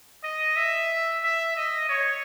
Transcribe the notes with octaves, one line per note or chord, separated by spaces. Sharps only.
D#5
E5
E5
D#5
C#5